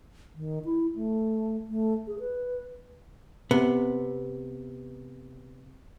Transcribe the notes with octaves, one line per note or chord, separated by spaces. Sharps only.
D#3
E4
A3
A3
G#4
B4
C3 B3